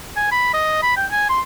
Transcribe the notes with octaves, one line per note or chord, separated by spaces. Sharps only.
G#5
B5
D#5
B5
G5
G#5
C6